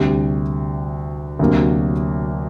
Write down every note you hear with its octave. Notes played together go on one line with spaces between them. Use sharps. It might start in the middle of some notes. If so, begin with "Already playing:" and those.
Already playing: D2 C3 G3
D2 C3 F#3 A#3